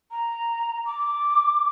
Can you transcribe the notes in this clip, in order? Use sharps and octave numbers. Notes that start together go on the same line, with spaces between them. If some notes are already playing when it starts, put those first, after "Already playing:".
A#5
D6